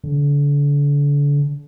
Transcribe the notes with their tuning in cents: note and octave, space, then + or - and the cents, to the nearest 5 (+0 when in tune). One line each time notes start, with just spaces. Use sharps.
D3 -35